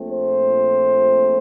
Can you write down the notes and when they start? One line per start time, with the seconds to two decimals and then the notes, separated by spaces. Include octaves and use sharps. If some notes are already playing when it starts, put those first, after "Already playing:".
Already playing: A#1 A#2 A3 C4
0.10 C5